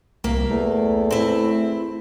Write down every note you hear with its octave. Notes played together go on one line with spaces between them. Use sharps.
C2 A#3 E5
E2 A3
C4 E4